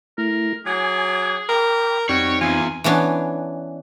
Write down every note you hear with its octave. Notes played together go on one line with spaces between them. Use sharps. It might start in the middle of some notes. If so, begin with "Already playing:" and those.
A3 E4 A#4
F#3 G#4 G#5 D6 G#6
A#4 G5 B5 D6
F2 G3 C4 D#4 F#4 C#5
E2 F4 G#5
E3 B3 C#4 D4